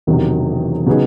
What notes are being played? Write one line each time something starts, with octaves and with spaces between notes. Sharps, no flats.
E1 E2 C3 D#3 F#3
C#3 F#3 B3 D#4 G#4